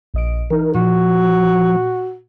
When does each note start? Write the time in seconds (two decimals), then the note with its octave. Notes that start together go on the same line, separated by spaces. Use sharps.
0.14 A#1 D#5 D7
0.50 E3 D#4 A#4
0.75 A#2 F3 F#4